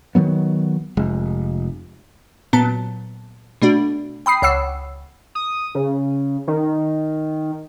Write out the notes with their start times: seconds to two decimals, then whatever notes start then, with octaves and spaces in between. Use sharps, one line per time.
0.15 D#3 F3 F#3 B3
0.97 F1 G#3
2.53 A#2 F#3 B3 A5
3.62 B2 A3 D4 F#4
4.26 G5 B5 D#6 C7
4.42 C#2 C#5 F#5 E6 C7
5.35 D#6
5.75 C#3
6.47 D#3